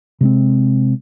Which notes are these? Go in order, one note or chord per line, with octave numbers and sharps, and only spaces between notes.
C3 G#3 C4